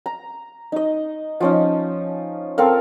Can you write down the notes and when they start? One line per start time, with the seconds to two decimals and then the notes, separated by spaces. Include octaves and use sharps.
0.06 A#5
0.72 D#4 D#5
1.40 F3 C#4 D#4
2.58 C4 A4 A#4 F5